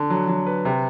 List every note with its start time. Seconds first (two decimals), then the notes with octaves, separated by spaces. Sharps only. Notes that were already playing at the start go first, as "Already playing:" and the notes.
Already playing: D3
0.10 F#3
0.28 F#3
0.47 B4
0.65 C3